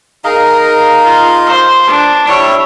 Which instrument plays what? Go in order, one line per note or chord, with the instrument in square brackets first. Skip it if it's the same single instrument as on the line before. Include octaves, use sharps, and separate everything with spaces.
[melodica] D#4 D#5 F5 [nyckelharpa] G#4 A#4
[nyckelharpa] F4
C5
D4
[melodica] G3 E4 E5 [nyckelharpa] C#5